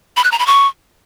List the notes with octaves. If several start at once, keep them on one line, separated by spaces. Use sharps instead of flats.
B5
F#6
A#5
B5
C#6